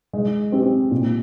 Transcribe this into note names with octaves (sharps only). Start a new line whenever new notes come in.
G#3
C4 G4
A#2